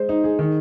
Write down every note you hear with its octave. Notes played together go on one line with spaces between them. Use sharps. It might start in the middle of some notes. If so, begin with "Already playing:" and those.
Already playing: G#3 C5
D#4
G#4
D#3